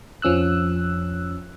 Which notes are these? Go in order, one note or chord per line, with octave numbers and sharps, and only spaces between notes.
F2 F3 C#4 E6 F#6